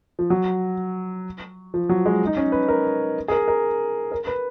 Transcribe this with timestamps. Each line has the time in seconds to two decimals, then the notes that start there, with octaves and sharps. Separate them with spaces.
0.19 F3
0.30 F#3
1.74 F3
1.89 F#3
2.06 G#3
2.27 D#4
2.37 C#4
2.52 B4
2.68 A#4
3.28 G#4
3.32 A#4
3.48 A#4
4.12 A#4
4.27 B4